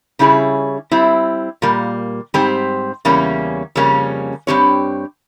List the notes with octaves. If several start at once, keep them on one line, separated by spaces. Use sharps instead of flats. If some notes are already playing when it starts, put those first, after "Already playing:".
C#3 G3 C#4 E4 G#4
G3 C4 E4
A#2 G3 A#3
G#2 G3 C4 G4 C5
E2 C#3 G3 A#3 C#4
F2 C#3 G3 A#3 C#4
G2 F3 C4 G4 C#5